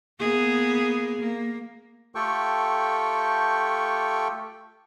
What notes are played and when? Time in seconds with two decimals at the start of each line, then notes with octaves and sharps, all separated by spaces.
0.20 A#3 B3 G#4
1.19 A#3
2.15 A3 F4 G4 A4 G5 C#6